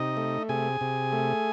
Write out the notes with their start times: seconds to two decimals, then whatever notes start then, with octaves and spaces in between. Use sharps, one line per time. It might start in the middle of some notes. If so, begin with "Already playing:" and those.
Already playing: C3 D#4 D#5
0.17 A3
0.49 C3 G#4 G#5
0.81 C3
1.13 A3